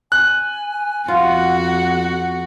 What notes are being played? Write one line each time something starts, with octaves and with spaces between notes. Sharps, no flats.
G#5 F#6
F2 F4 F#4 F#5